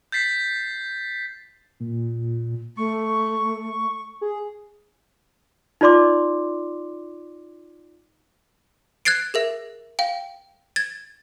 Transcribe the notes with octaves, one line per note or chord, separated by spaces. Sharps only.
G6 A6 B6 C7
A#2
A3 C#6
G#4
D#4 F4 D5 C6 D6
F#6 G#6 A6 C7 D7
G#4 A#4 E5
F5 G5
G#6 A6